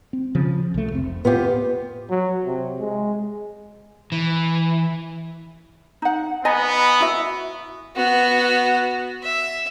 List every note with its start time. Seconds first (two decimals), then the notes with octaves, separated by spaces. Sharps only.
0.13 C4
0.35 C#3 F3
0.74 C2 A3
0.92 F1 C4
1.25 A2 B3 F4 G4
2.10 F#3
2.46 C3
2.80 G#3
4.12 E3
6.02 D#4 F#5
6.45 B3 D#5 G#5 A#5
7.00 E4 F#4 E5
7.96 B3 F#4
9.23 E5